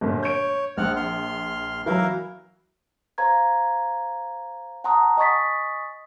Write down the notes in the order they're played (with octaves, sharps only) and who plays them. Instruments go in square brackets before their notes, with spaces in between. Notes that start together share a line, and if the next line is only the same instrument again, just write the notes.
[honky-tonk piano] G1 A#2
[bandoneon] C#5 [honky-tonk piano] G6 D7
[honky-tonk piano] A#1 [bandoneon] C4 F#5 F6
[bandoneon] C6 F6
[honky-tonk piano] E3 F#3 [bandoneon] E4 A#4 F5
[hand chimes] C5 F5 A#5 C6 G#6
F#5 A5 A#5 C6 D#6
D#5 G#5 C#6 D#6 A6 B6